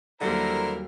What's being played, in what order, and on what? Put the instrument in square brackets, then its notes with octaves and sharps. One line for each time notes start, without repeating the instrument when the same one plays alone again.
[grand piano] D#2 F#3 G3 [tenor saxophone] D3 [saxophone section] E4 A#4 [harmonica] C5 A#5